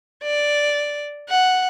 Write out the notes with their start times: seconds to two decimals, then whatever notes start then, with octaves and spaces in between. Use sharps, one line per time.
0.23 D5
1.29 F#5